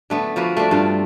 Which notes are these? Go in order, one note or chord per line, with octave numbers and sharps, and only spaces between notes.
D3 A3 B3
F3 A#3 F#4 B4
A3 C4 D4
G2 C4 F4